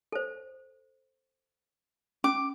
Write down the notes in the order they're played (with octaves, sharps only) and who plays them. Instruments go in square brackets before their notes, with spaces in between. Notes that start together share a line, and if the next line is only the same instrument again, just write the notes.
[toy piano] A4 C5
[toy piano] C#4 [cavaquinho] D6